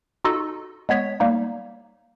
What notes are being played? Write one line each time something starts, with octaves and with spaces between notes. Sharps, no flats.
D#4 F4 F#4 A4 D#5
G#3 B3 C#5 B6
G3 A#3 D#4